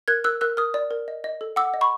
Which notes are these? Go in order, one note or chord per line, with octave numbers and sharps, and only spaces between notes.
A#4 F#6 G#6
A#4 E6 F#6
A#4 E6 F#6
A#4 D#6 F6
D5
A#4
D#5
D#5
A4
F#5 D6 E6
D#5
B5 C#6